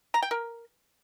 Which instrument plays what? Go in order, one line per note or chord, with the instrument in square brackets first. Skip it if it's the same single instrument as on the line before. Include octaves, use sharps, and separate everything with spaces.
[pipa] A#5
G5
A#4